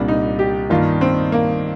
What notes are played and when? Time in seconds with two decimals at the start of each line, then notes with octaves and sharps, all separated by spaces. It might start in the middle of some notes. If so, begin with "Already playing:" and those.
Already playing: C2 A#2 G3 D4
0.08 D#4
0.39 G4
0.70 G2 D#3 A#3 D#4 F4
1.01 C4
1.32 A#3